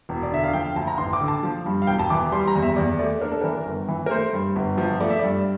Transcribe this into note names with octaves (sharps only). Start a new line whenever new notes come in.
E1
D5
D3 E5
F5
F3 G5
F5
D2 A5
A#5
A1 C6
D6
D3
A5
F3
G2
F5
E1 G5
A5
E3 D6
G3 C6
A#5
E2
E5
E2 D5
A3 D5
D4 A#4
A4
E3 A#4
G1
E3
A#4
A3 C5
G2
G1
F3
A3 D5
E5
G2 D5